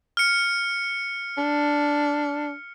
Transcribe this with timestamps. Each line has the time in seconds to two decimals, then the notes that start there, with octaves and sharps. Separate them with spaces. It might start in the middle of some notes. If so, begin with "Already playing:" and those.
0.17 F6 C#7
1.38 D4